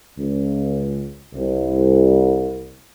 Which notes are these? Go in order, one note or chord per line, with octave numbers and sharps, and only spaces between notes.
C#2
C2